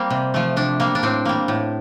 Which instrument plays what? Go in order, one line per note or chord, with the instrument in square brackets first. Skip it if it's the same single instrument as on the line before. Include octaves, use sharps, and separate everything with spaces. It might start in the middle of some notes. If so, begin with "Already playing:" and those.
Already playing: [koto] G3 A#3 C4
C3
F3 A3
C3 D4
G3 A#3
D4
A2 C4
G3 A#3
A2